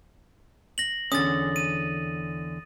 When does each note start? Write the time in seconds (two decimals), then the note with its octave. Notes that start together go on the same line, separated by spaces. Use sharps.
0.78 A#6 F#7
1.12 E2 D3 C#4 D#6 A6
1.56 D#7